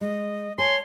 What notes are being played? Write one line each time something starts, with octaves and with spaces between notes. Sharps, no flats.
G#3 D#5
C#5 G#5 A5 C6